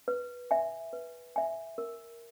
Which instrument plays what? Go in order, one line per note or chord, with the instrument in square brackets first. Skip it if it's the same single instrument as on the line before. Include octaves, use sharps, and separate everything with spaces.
[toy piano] B4
E5 G#5
B4
E5 G#5
A#4